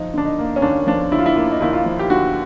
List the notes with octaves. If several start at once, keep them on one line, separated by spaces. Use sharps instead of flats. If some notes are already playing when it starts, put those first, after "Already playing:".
Already playing: F3 D#4
D3 D4
D#4
A#3
C#4
D#2 D4
F3 D4
D3 E4
F4
E4
A#3 F4
D#4
D#2 E4
F4
F3
G4
D3 F#4